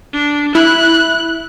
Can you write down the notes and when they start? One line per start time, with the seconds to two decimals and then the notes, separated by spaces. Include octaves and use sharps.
0.14 D4
0.55 E4 F#6